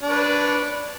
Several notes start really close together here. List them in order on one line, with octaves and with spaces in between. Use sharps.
D4 C#5 B4